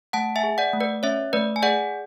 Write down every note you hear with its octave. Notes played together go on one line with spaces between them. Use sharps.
A3 F#5 A5
E5 G#5
G#4
D5 F#5
A3
B4 D5
C#4 C#5 E5
A3 B4 D5
G#5
G#4 D5 F#5